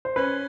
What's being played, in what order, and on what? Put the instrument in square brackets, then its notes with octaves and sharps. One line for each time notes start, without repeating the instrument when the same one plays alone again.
[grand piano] C5
[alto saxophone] C#4 [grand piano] B4